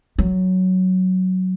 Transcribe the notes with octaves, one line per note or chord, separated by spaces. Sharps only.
F#3